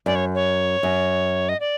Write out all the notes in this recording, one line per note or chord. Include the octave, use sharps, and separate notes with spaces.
F#2 D5
C#5
C#5
F#2
D#5
D5